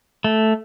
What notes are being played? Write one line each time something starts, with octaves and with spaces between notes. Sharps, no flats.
A3